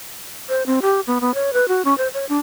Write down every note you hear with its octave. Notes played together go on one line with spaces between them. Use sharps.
C5
C4
G4
B3
B3
C#5
B4
F#4
C#4
C5
C#5
D4